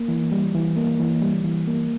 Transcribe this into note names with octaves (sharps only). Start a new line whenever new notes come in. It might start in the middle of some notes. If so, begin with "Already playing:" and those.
Already playing: A#3
E3
G3
E3
A#3
E3
G3
E3
A#3